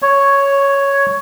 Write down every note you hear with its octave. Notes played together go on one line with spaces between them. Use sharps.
C#5